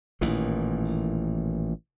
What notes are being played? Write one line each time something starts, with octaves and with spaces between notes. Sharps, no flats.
A1 A#2 D#3 E3